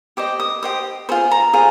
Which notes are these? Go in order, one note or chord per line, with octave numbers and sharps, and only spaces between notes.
G4 C5 D#5 D6
D#6
G4 C5 D#5 D#6
F4 G#4 C5
A#5
F4 G#4 C5